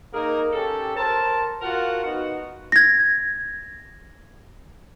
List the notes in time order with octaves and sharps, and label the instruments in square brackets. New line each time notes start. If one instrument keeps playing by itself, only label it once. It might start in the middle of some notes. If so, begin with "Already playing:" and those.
[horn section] A#3 D#4 G#4 A#4
C#4 G4 A4
A#4 C5 A5
F4 F#4 A#4 F5 F#5
B3 D#4 F#4
[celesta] G#6 A#6